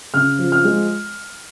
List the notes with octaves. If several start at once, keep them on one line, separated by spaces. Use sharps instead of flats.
C#3 F6
F3
F6
G#3